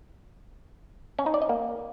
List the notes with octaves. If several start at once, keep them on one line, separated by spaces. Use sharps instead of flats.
C#4
D#4
D5
D#5
A#3